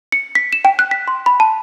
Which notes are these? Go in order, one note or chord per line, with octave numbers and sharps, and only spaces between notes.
C#7
B6
E7
G5
F#6
B6
C6
B5
A5